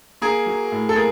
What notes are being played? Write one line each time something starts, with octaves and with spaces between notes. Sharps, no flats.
A#3 G#4 A#4
F#3
A2
A4
A#3 G#4 A#4